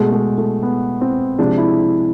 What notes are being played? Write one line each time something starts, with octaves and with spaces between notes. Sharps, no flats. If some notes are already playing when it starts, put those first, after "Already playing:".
Already playing: B2 G#3 A3
G#3
A3
B3
C4
C3 F3 G#3 D4
E4